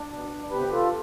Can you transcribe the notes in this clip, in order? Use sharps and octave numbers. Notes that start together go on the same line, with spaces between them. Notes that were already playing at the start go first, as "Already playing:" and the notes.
Already playing: D4
B2 B3
D2 C3 G3 B3 G4 B4
F4 A4